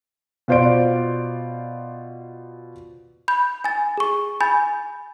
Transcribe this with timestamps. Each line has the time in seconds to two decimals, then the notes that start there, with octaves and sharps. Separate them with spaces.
0.48 B2 F4 C5 D5 D7
3.28 B5 G6
3.64 G#5 A6
3.97 G#4 C#6
4.41 G#5 B5 G6 A6